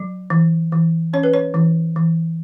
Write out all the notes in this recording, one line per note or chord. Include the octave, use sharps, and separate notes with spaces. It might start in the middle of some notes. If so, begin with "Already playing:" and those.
Already playing: F#3
E3
E3
C#4 C#5
B4
C#5
E3
E3